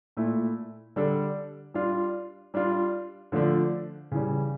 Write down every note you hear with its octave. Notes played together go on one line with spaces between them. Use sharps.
A#2 A3 E4
D3 G3 D4 A4
G3 D4 F4
G3 D4 F4
D3 F3 A3 D4
C#3 E3 G3